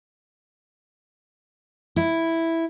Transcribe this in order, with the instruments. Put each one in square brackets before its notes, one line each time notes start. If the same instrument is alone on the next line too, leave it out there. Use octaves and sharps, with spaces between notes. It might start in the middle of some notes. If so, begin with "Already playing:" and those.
[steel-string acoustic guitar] E4